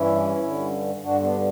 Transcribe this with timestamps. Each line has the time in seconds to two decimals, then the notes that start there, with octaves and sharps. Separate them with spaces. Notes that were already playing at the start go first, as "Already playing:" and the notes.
Already playing: G2 E3 C#4 E4
0.44 G2 D3
1.03 G2 D3 D4 F#4
1.22 B3 D4